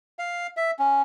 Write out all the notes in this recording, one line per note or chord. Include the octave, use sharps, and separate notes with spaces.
F5
E5
C#4